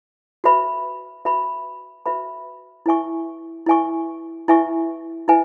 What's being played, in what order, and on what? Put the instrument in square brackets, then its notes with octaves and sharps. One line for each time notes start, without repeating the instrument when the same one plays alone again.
[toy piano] F#4 B4 E5 B5
F#4 B4 E5 B5
F#4 B4 E5 B5
E4 B4 E5 G#5 C#6
E4 B4 E5 G#5 C#6
E4 B4 E5 G#5 C#6
E4 B4 E5 G#5